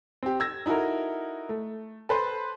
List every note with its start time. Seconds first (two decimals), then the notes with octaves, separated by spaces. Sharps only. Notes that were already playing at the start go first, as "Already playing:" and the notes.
0.23 C4 G4
0.40 E6 G#6 A#6
0.66 D#4 E4 F#4 A4 A#4
1.49 A3
2.09 A4 B4 C5